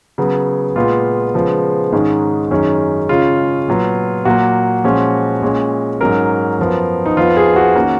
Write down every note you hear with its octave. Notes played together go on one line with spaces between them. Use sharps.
C#3 F#3 B3
A#2 G#3 B3 F4
C#3 F3 G#3 B3
G#2 D#3 G#3 C#4
F#2 D#3 G#3 C#4
C#3 G#3 C#4 F4
A#2 F#3 B3
A#2 F#3 A#3 F#4
A#2 F3 G#3 C#4
A#2 G#3 C#4
G#2 F#3 C#4 A#4
F#2 F3 B3
D#4
F2 F3 B3 F4
G#4
F#4
D#3 A#3 C#4